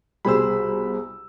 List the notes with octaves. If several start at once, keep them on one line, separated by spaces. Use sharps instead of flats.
C2 B2 G3 G#4 C5 B5 E6